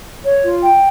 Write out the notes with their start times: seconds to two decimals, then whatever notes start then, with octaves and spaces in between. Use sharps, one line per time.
0.24 C#5
0.43 F4
0.63 G5